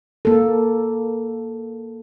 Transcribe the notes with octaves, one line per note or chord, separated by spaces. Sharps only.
A#3 A4